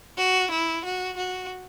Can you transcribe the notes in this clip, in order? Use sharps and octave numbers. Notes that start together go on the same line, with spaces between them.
F#4
E4
F#4
F#4